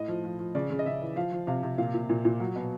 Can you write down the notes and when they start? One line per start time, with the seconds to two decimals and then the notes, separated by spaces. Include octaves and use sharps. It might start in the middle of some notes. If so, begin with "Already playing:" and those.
Already playing: A2 D#5
0.08 F3
0.24 F3
0.39 F3
0.55 C#3 D5
0.70 C#3
0.79 D#5
0.86 C#3 E5
1.01 E3
1.16 F3 F5
1.32 F3
1.47 C3 F5
1.63 C3
1.78 A#2 F5
1.94 A#2
2.09 A#2
2.25 A#2
2.40 F#3
2.56 B2